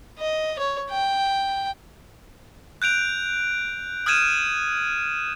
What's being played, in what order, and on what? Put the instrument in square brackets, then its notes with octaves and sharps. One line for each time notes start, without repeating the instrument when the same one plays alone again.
[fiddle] D#5
C#5
G5
[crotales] F#6 G6 D7 F7
D#6 F6 G6 G#6 D#7 E7